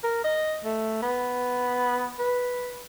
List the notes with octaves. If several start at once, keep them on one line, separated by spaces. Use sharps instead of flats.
A#4
D#5
A3
B3
B4